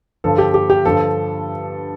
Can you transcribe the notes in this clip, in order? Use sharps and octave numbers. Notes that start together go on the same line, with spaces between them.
G2 D3 F3 A4
G4
G4
G4
G2 D3 F3 A4